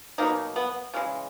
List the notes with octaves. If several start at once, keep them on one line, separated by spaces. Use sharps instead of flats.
B2 F#3 A#3 D#4
B3
C#3 E3 G#3